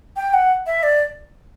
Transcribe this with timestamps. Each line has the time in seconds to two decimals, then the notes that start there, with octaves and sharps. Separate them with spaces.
0.16 G5
0.33 F#5
0.66 E5
0.83 D5